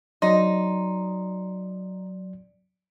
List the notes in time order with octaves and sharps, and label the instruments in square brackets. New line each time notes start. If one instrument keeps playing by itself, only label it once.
[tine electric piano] F#3 D5 C6 [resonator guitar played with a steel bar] D#4